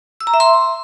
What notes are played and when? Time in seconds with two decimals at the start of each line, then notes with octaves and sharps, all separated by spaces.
0.21 E6
0.27 A#5
0.34 E5
0.40 C6